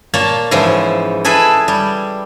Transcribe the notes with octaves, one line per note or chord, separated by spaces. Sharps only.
A#2 A#3 C#5 A5
G#2 C#3 E3 F3
E4 G#4 A4 B4 E5
G3